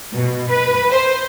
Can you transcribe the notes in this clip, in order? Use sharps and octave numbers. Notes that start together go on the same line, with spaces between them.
B2
B4
C5